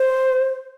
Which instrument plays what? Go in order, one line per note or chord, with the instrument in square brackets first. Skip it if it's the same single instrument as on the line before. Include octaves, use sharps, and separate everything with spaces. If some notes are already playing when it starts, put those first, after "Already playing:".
Already playing: [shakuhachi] C5